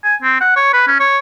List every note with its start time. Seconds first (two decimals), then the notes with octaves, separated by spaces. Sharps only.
0.04 G#5
0.22 C4
0.41 F#5
0.56 C#5
0.73 B4
0.87 C#4
1.00 C#5